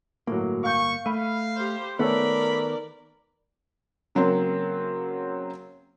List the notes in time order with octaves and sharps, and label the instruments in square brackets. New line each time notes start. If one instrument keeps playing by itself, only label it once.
[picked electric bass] G1 A#3 [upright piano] A2 F#3
[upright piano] F5 G6 [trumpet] C#6
[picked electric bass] A3 [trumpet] F5 [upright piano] B5 D#7
[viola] G4 C5
[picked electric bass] D#3 B3 [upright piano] A3 A4 C#5 [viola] A#4 D5 [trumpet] B5
[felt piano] C#3 F#3 A#3 C4